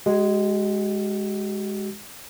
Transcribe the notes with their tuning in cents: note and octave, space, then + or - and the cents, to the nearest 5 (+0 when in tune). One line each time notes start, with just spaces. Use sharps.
G#3 +0 F#4 +45